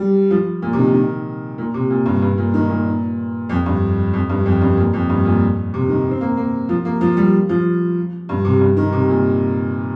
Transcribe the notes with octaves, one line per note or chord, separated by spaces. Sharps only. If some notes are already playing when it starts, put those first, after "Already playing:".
Already playing: G3
F3
A#2
C3
D#3
D#3
A#2
C3
A#2
G2
G2
A#2
D#3
A#2
F2
G2
F2
G2
F2
G2
A#2
F2
G2
A#2
C3
D#3
C4
A#3
A#3
F3
A#3
F3
G3
F3
G2
C3
G2
D#3
C3
A#2